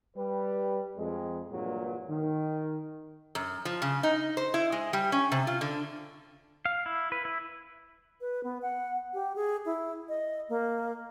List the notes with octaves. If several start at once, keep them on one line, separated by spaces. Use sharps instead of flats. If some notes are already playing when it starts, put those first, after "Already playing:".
G3 B4
F2 G#3
G2 A#2 E3 F#3 G#3
D#3
F#2
F3
C#3
D#4
C5
E4
G#3
G3
C#4
C3
F4
D3
F5
E4
B4
E4
B4
B3
F#5
G4
G#4
E4
D#5
A#3